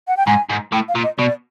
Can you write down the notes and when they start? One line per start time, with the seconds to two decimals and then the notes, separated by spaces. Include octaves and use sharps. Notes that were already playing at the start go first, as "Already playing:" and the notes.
0.08 F#5
0.17 G5
0.27 G#2 G#5
0.49 G#2
0.72 A2 G5
0.88 F5
0.95 A#2
1.03 D#5
1.19 B2 D5